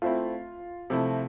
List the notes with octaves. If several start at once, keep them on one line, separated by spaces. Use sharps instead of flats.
A3 C4 E4 F4
C3 F3 A3 E4